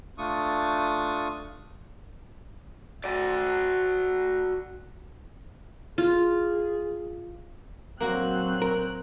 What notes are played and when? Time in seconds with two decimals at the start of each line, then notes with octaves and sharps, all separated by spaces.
0.18 A3 D4 F4 C#6 D#6
3.04 F#4 D5
5.98 F4 G#4
8.00 A#2 F#3 A#3 C4 F#4 F#6
8.62 A#4